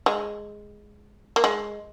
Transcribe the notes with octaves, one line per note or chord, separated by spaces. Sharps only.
G#3
A#3
G#3